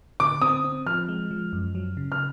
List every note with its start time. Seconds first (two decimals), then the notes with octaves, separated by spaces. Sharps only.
0.20 D3 D6
0.42 C4 D#6
0.64 C4
0.86 F3 F6
1.09 G#3
1.31 F3
1.53 F#2
1.75 F#3
1.97 C#3
2.12 F6